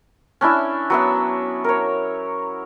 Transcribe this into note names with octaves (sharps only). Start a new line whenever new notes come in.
C#4 D4 E4 E5
F#3 B3 E5
A#4 C#5